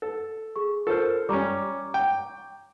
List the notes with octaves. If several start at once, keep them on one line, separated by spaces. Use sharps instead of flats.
A4
G#4 C#6
F4 A4 A#4 C5 F6
G3 C#4 A#5 C#6 D6
G5